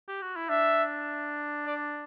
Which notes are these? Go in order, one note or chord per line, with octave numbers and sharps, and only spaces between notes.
G4
F#4
E4
D4 E5
D5